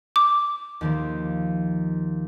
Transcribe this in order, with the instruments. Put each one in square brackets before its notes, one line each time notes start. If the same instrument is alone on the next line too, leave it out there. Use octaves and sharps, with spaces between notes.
[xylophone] D6
[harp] D#2 D#3 F3